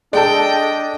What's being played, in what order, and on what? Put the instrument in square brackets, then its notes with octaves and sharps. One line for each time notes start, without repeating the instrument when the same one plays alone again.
[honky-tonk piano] G#3 A4 [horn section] D4 D#5 [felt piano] D5 A5 [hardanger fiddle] G5